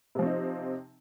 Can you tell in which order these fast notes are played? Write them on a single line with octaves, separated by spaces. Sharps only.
C3 F3 C4 D#4